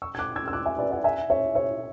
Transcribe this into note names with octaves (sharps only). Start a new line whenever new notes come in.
C#6 E6
G#6
D6 F#6
E6 G#6
E6
D6 F#6
E5 G#5
B4 D5
D5 F#5
E5 G#5
C#5 E5
C#5 E5